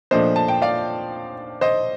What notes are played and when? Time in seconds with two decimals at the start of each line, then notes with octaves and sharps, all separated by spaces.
0.11 A#2 F3 A3 D4 C5 D#5
0.36 A5
0.48 G5
0.62 D5 F5
1.61 C5 D#5